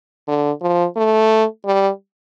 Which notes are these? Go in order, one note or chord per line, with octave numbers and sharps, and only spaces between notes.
D3
F3
A3
G3